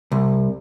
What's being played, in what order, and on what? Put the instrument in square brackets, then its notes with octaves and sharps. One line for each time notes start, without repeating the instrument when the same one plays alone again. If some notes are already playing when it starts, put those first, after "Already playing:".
[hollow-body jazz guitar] C2